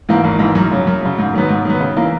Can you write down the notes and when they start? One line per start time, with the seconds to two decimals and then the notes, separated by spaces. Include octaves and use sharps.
0.09 G#2 E3 A#3
0.24 G#1
0.39 G#2 E3 A#3
0.55 F#2
0.71 C#3 F#3
0.87 F#2
1.02 C#3 F#3
1.18 G#2
1.34 D#3 F#3 B3
1.49 G#2
1.65 D#3 F#3 B3
1.80 C#3
1.96 E3 A#3